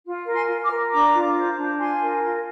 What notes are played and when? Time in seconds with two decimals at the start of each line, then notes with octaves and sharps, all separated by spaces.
0.04 F4
0.26 A#4
0.33 G#5 C6
0.48 F4
0.63 D6 F6
0.70 A#4
0.92 D4 A#5 D6
1.14 F4
1.36 C5
1.57 D4
1.79 F4 G#5 C6
2.01 A#4
2.23 F4